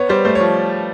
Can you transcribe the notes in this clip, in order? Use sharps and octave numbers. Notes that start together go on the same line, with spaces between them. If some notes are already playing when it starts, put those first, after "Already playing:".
Already playing: B3 C#5
G3 C5
A3 C5
C#5
F3